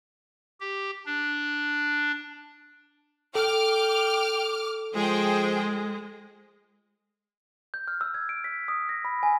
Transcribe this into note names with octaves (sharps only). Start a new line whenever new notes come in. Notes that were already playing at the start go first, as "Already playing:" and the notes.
G4
D4
A4 G5 D6 F6
F3 G#3 G#4 C5 G5
G6
F6
E6
G#6
D7
B6
D#6
A#6
B5
G#5